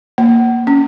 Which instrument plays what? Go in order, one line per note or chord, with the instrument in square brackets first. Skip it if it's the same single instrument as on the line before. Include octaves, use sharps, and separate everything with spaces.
[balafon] A#3
C#4